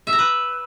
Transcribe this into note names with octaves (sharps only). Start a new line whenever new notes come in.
E5
A#5
B4